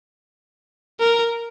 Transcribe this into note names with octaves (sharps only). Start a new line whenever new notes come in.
A#4